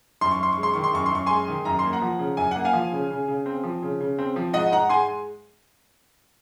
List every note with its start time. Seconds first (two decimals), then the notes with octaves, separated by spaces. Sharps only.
0.21 F#2 C6
0.31 C#6
0.40 F#2 C6
0.53 G#3 C#6
0.63 C6
0.74 D#3 C#6
0.84 C6
0.93 F#2 C#6
1.06 C6
1.11 F#2 C#6
1.26 G#3 G#5 C6
1.48 D#3
1.65 F#2 A#5
1.79 C6
1.84 A#3
1.93 F#5 A#5
2.01 F3
2.19 C#3
2.37 F#2 G#5
2.51 A#3 F#5
2.65 F5 G#5
2.73 F3
2.92 C#3
3.10 C#3
3.28 C#3
3.46 C4
3.63 F3
3.82 C#3
4.00 C#3
4.19 C4
4.36 F3
4.53 G#2 D#5 F#5
4.71 G#2 F#5 A#5
4.89 G#3 G#5 C6